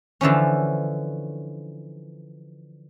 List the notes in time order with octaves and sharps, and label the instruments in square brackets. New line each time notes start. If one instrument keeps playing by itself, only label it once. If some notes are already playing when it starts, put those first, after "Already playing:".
[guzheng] D3 E3 F3 C#4